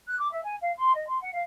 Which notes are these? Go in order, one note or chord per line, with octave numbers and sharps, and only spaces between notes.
F#6
D6
E5
G#5
F5
C6
D#5
C6
F#5
F5